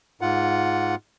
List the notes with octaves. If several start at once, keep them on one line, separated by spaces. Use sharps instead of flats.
G#2 F4 F#5